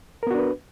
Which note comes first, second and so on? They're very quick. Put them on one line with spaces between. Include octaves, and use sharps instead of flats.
A#4 B3 F#4 D4 B4